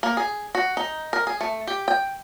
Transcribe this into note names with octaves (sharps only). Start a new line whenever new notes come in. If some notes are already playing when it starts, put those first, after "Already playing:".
A#3
G#4
F#4
D#4
A#4
G#4
A3
G4
G5